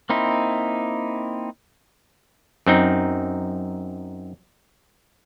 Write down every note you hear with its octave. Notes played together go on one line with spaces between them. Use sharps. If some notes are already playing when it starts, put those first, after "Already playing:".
A#3 C4 D#4 E4
F#2 C4 D#4